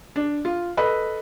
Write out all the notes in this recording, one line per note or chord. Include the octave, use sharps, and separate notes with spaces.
D4
F4
A4 B4 D#5